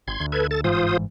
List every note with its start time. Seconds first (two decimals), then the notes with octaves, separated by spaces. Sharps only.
0.08 G#1 C6 G#6
0.20 D2
0.32 A4 B4 G#6
0.51 A4 A6
0.64 G1 G#2 E3 F4 C5 D#6